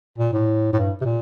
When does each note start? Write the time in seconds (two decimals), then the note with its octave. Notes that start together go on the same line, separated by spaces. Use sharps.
0.18 A#2
0.33 A2
0.73 A2
0.76 G2
1.01 C3
1.05 A#2